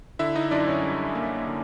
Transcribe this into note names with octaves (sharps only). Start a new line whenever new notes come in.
D3 E4 E5
D#4 D#5
F#2 D4 D5
C#4 C#5
G3
A#3
D3